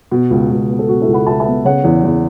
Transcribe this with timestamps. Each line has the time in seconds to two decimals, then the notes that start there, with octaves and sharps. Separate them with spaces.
0.12 B2
0.30 C#2
0.50 C#2
0.69 B3
0.79 A4
0.89 B2 F#4
1.01 E4 A4
1.07 C#2
1.13 F#5 B5
1.26 C#2 E5 A5
1.40 E5 A5
1.46 B3
1.65 C#3 C#5 F#5
1.84 E2
2.04 E2